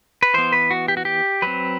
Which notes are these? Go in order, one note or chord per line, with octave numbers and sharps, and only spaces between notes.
B4
E3 B3 C5
B4
F#4
G4
F#4
G4
F#3 C4 B4